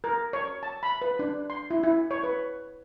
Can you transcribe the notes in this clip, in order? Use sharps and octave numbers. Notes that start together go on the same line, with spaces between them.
A#4
C#5
A5
B5
B4
D4
C6
E4
E4
C#5
B4